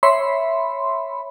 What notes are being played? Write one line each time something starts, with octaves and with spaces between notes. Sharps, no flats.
C#5 E5 B5 C6